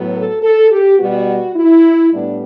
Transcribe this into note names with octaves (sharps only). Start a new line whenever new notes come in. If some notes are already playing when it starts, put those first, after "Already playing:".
Already playing: A2 F#3 B3
A4
A4
G4
B2 G3 B3 F#4
E4
A2 G3 B3 D4